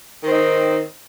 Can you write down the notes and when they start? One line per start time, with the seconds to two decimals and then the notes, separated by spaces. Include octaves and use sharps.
0.22 D#3
0.27 C4
0.31 D#4